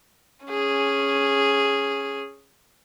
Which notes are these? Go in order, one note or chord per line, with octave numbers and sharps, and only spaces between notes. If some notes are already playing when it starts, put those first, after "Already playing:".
C#4 G#4